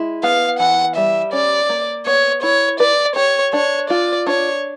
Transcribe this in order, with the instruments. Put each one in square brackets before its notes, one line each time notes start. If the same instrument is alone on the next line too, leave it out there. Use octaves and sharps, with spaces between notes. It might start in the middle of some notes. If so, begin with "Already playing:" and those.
Already playing: [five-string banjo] G#3 E4
[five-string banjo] B3 [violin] F5
[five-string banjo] E3 [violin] F#5
[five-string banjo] G3 [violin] E5
[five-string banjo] C#4 [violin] D5
[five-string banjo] A#3
[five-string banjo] B3 [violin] C#5
[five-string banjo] E4 [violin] C#5
[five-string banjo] B4 [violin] D5
[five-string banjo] G4 [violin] C#5
[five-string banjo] D4 [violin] C#5
[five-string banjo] F4 [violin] D5
[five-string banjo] D4 [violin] C#5